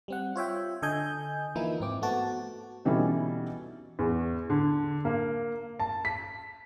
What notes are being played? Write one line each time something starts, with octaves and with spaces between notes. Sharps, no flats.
G3 C4 F#5
F4 C#5 E5 G5
D3 A4 D#5 G#5 G6
E3 F3 A#3 D#4 E4
G#2 C4 D6
A3 B3 F#4 A5
B2 E3 G3 C#4 D#4 A4
E2
D3
A#3
A5
B6